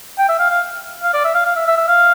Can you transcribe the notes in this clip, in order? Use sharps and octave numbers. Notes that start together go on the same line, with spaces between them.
G5
E5
F5
F5
F5
D5
E5
F5
F5
E5
E5
E5
F5